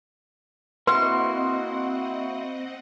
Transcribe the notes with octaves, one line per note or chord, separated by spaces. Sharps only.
A#3 C4 E4 F#4 B4 D#5 F#5 C6